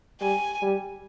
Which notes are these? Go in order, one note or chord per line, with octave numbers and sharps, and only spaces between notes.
G3 G#5
G3